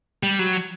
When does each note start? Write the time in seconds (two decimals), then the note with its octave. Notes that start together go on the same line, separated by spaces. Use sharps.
0.23 G3
0.39 F#3